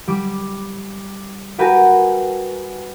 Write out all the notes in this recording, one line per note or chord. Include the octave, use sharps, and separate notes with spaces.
G3 D6
F#4 G4 A#4 B4 G5 G#5